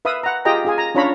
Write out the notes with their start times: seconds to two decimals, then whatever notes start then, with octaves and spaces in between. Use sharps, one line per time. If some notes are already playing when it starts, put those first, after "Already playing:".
0.05 B4 E5 F5 B5 D#6
0.23 F#5 A#5
0.45 F4 G4 G#4 D#5 G5 A#5
0.65 F4 G#4 G#5
0.78 A#5
0.95 C#4 D4 F4 C#5 A#5 B5